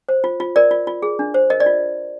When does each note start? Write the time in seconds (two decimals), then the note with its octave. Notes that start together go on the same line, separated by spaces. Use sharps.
0.09 C5
0.24 F4
0.40 F4
0.56 A#4 D5
0.71 F4
0.87 F4
1.02 G#4
1.19 D4
1.34 C5
1.50 A#4 D#5
1.60 D5
1.66 F4